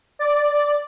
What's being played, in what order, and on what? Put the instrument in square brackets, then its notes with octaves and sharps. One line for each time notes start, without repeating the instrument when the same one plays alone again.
[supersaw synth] D5